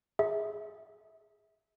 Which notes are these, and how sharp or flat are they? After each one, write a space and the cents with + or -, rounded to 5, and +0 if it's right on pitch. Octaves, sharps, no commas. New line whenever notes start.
G#4 +0 E5 -30